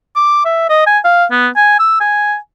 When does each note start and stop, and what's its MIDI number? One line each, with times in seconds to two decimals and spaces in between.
0.15 0.45 86
0.45 0.67 76
0.69 0.85 75
0.87 0.99 80
1.04 1.25 77
1.31 1.48 59
1.56 1.77 80
1.79 1.99 88
2.00 2.36 80